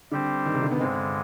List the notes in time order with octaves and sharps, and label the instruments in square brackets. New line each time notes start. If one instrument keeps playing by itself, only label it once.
[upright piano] D3 [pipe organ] G3 C4 G4 C5
[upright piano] D#3
C3
D3
B3
[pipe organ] G2 D3 G#3 [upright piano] C4